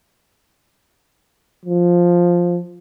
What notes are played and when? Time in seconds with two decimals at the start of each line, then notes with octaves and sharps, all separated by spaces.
1.66 F3